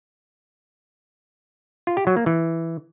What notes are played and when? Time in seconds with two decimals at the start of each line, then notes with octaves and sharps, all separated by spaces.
1.87 F4
1.97 G4
2.07 F#3
2.17 A#3
2.26 E3